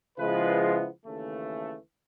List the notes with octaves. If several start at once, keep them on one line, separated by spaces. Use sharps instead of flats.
C#3 F3 G#3 B3 E4 B4
D#2 C#3 E3 A3